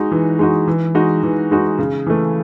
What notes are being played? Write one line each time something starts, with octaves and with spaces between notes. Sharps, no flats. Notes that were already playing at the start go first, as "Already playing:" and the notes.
Already playing: G#3 D#4 F#4
E3
G#3 D#4 F#4
E3
G#3 D#4 F#4
E3
G#3 D#4 F#4
C#3
E3 A3